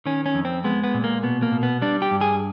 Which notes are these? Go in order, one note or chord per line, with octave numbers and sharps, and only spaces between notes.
D#3 C#4
C#4
F2
C4
G#3 B3
B3
A#2
A#3
B2 B3
A#3
B2
B3
G3 D4
G4
G2
G#4